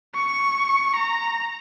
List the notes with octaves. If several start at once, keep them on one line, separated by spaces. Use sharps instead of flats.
C#6
A#5